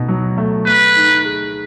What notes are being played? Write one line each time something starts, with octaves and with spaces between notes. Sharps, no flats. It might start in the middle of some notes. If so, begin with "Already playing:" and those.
Already playing: B2 A3 D#4
F#3
A3
A3 B4
D#4
G#4